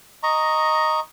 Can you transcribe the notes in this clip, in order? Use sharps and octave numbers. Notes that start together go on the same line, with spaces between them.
D#5 A#5 C#6